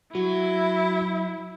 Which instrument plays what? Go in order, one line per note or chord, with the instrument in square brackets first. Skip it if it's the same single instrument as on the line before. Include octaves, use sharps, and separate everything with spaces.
[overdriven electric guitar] F#3 [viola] E4 [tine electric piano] F#4